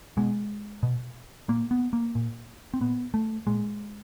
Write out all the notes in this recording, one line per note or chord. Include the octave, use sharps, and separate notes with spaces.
B2 G#3
B2
A#2 A#3
B3
A#3
A#2
C4
A#2 B3
A3
A#2 G#3